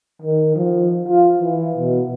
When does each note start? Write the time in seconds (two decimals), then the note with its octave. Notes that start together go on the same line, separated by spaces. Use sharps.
0.22 D#3
0.55 F3
1.09 F4
1.39 E3
1.76 B2